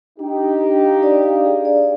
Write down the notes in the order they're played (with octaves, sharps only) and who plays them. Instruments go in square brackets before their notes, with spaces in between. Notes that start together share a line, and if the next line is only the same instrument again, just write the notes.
[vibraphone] D4 [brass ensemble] D#4 G4
[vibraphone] D4
D4
F5
D5
F5
G#4
D5